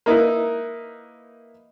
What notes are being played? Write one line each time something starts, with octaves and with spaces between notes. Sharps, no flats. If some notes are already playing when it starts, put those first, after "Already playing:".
A#3 D#4 E4 B4